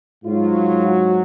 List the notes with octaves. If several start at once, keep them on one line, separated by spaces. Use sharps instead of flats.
G#2 F#3 F4
F#4